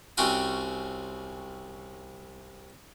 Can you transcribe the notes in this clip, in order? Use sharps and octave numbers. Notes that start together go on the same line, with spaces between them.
C2 C4 C#4 F#4 G5 D#6